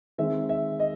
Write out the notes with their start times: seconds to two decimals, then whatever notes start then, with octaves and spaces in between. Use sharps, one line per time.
0.18 D#3 G#3 C4 E5
0.49 E5
0.80 D#5